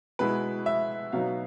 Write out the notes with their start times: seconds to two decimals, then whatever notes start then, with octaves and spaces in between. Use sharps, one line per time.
0.19 B2 G#3 B3 E4 B4
0.66 E5
1.13 B2 F#3 B3 D#4 F5